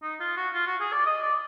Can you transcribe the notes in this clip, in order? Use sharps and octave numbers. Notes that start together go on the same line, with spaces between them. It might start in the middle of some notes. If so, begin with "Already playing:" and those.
D#4
F4
F#4
F4
F#4
G#4
D5
D#5
D5